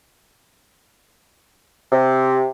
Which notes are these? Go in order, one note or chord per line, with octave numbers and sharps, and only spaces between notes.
C3